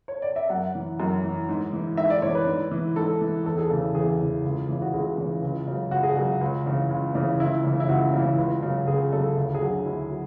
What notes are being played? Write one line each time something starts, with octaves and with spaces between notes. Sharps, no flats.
C#5
D5
E5
F#2 F#5
E3
F#2
E3
G#2
E3
G#2 E5
D5
E3 C#5
B4
G#2
E3
G#2 A4
E3
E2 A4
G#4
C#3 E3 A4
E2 G#4
C#3 E3
C#2
C#3 E3
F#4
C#2 G#4
C#3 E3
C#2
C#3 F#3
C#2 F#4
G#4
C#3 F#3 F#4
C#2
C#3 E3
C#2
C#3 E3
C#2 E4
C#3 E3
E4
C#2 F#4
C#3 E3
C#2
C#3 F#3
C#2 G#4
C#3 F#3 A4
D2
G#4
D3 F#3 F#4
D2 E4
F#3